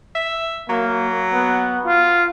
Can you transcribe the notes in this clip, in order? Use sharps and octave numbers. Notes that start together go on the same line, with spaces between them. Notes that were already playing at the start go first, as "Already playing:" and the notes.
E5
F#3 A#3
B3
F4